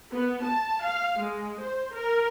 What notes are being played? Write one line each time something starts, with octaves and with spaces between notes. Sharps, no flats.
B3
A5
F5
G#3
C5
A#4